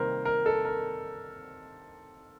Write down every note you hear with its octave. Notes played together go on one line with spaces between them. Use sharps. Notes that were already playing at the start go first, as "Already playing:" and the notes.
Already playing: C3 D#3 G3 A#3 A#4 C5
A#4
A4
A#4